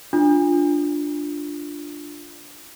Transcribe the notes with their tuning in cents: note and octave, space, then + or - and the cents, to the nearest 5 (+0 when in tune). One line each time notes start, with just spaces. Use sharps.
D4 +0 F4 +0